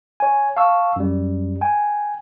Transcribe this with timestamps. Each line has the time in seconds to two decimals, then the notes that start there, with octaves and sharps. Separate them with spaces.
0.20 C#5 G#5
0.57 F5 A5 C#6 E6
0.96 F#2 G3
1.61 G5 G#5